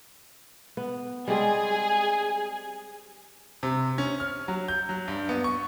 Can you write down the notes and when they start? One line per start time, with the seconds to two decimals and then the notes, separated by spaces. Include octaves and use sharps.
0.77 B3
1.28 G3 G#3 C4 G#4
3.63 C3
3.98 C#4
4.20 F6
4.48 F#3
4.68 G6
4.89 F#3
5.08 G2
5.29 B3
5.44 C#6